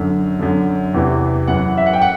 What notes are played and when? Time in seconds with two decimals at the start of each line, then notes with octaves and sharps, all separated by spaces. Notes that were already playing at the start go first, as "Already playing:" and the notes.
Already playing: F#2 D3
0.39 F#2 D3
0.94 E2 C3 E3
1.48 F#2 E3 F#5
1.77 E5
1.86 F#5
1.93 G5
2.01 F#5